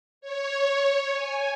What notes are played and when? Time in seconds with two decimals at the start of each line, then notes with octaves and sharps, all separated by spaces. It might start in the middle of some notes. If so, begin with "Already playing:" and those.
0.21 C#5
1.14 G#5